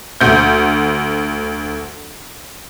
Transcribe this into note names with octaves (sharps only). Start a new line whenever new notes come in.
D2 G6